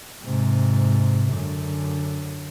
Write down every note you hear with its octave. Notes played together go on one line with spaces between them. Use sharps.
G#2 C3
F#2 D3